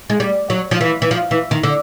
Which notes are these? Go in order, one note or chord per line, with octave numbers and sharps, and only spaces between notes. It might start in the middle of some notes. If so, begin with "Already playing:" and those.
G#3
G3
F#3
F3
E3
E3
F3
E3
D#3
D3